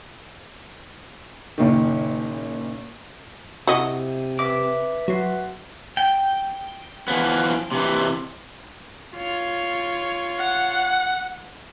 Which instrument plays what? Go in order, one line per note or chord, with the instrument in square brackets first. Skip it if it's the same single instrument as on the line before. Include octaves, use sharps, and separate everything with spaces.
[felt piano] F#1 A#2 D#3
[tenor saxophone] C3 [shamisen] E4 D#5 [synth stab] F#4
[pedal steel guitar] B4 E5 D6
[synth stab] F#3 C6 [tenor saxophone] F#4
[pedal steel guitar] G5
[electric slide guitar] E3 F3 B3
C3 E3
[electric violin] F4 C#5
[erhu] F#5